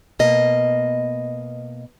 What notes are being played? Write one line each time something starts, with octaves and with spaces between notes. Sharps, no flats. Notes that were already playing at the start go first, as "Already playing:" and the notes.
B2 A#3 D#5